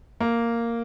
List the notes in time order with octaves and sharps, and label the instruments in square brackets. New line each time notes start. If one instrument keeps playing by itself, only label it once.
[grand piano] A#3